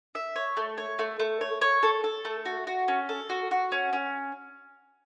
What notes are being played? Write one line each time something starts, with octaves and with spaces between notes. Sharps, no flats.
E5
C#5
A3
C#5
A3
A3
C#5
C#5
A4
A4
A3
F#4
F#4
C#4
A4
F#4
F#4
C#4
C#4